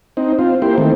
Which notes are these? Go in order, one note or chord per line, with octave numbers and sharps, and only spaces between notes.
C4 D#4
C4 F4
A#3 E4 G4 C5
D#3 A3 C4